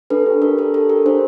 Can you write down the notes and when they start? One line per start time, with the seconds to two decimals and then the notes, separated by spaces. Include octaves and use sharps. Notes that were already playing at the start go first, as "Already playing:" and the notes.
0.10 D4 A4 B4
0.26 G4
0.42 D4 A#4
0.58 G4 A4
0.74 D4 A4
0.89 G4 A#4
1.06 D4 A#4 C5